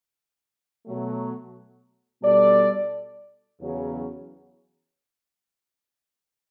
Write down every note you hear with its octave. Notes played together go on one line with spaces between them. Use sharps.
B2 F#3 A3
B2 G3 D4 A4 D5
E2 C#3 F#3